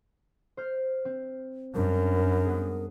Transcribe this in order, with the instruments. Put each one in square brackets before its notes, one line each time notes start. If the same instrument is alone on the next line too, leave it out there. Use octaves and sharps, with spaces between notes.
[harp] C5 F6 G6
C4
[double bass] F#2 [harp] G3 D4 [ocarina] A#4
[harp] B3 G#4